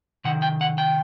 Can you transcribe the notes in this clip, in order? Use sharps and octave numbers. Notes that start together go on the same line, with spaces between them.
C3 D#3 F#5
G5
F#5
G5